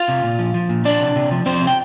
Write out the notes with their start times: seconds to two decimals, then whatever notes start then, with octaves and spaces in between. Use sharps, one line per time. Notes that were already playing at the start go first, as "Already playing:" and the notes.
Already playing: F4 F5
0.08 C3
0.24 A#2
0.39 F3
0.54 F3
0.69 A#2
0.85 F3 D4 D5
1.00 C3
1.16 C3
1.31 F3
1.46 F3 C4 C5
1.61 C3
1.67 G5